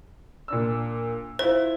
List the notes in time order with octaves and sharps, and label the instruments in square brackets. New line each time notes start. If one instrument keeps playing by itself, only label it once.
[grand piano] A#2 D4 E6
[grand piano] E4 F4 [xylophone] C5